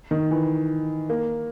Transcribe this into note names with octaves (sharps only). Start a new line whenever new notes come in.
D#3
E3
A#3